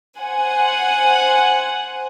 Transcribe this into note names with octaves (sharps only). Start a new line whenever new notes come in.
C5 F#5 G#5